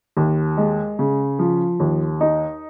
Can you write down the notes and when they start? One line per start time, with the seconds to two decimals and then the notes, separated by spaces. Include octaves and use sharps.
0.17 D#2
0.57 G#3
0.99 C#3
1.39 F3
1.80 D#2
2.21 D#4